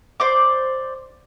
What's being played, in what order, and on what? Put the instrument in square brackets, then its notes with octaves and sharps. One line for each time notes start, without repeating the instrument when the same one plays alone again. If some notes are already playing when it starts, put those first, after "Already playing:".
[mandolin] C5 D5 D6